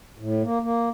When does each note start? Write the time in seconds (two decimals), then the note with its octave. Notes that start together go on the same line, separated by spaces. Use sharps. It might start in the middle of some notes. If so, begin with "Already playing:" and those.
0.19 A2
0.42 A#3
0.62 A#3